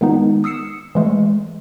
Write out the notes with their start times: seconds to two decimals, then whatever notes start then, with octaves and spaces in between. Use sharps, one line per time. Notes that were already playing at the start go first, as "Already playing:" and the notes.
0.01 D#3 G#3 B3 D#4
0.44 D#6 E6 C7 C#7 E7
0.95 E3 G#3 A3